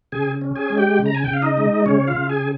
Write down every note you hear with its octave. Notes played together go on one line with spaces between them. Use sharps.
C#3 G#4 G#5
C#4
G#4 G#5
G#3
G4 G5
C#3
A#5
G#5
C#3 G5
F5
D#4 D#5
G#3
C#3 C#4 C#5
F4 F5
C#3
G#4 G#5